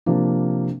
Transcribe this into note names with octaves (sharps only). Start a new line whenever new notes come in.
C3 F3 A#3 D4